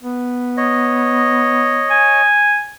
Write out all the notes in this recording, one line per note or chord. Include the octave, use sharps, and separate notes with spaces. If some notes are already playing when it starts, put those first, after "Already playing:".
B3
C#5 D#5
G#5